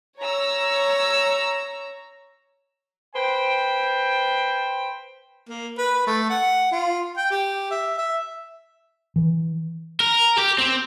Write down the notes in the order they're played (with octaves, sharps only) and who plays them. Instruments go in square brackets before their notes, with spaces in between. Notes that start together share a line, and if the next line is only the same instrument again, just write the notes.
[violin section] C#5 A#5 E6
[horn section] B4 C5 G5
[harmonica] A#3
B4
A3
F#5
F4
G5
G4
E5
E5
[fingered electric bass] E3
[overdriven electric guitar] A#4
G4
C4